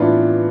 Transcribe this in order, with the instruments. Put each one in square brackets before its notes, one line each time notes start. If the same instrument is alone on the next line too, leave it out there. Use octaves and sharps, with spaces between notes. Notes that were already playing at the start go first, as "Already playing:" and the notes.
Already playing: [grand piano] A2 E3 B3 F4 [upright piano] D4 E4